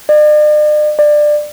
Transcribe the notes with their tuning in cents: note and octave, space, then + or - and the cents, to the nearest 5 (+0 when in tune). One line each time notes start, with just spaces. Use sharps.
D5 +45
D5 +20